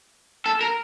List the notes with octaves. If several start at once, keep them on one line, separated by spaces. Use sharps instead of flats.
A4
A#4